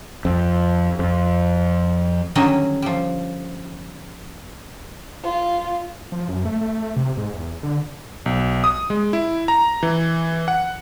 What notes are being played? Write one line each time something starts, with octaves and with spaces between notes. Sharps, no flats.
F2
F2
D3 D#3 F#3 G3 C#4 D#5
F3 G3
F4
F3
F#2
A3
A3
C3
G#2
E2
D3
B1
D#6
G#3
E4
A#5
E3
F#5